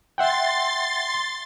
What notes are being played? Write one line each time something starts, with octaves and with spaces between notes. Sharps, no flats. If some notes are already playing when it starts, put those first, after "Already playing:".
E5 F#5 G5 C6 A6